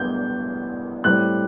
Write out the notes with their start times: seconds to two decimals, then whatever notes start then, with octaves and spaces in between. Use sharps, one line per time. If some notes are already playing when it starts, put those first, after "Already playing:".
Already playing: A2 G3 B3 D4 G6
1.04 A2 G3 C4 F#6